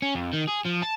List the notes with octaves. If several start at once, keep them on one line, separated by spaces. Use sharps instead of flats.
C#4
F2
D#3
G#4
F3
A5